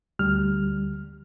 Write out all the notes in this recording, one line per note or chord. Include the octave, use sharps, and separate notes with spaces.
D2 G3 F6